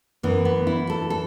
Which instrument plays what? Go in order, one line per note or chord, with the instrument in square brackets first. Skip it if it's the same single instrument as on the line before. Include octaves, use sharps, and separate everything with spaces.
[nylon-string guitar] F#2 E3 B3
B3
E4
A4
A4